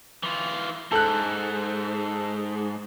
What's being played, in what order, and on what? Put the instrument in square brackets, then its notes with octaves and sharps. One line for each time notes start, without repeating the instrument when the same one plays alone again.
[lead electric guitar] E3 F4
[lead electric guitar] G#2 [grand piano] A4 F#6